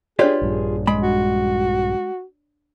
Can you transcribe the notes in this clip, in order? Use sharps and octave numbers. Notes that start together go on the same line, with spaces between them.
D4 F4 G4 G#4 B4 C#5 D5
A#1 G2 G#4
G#3 B5
F#4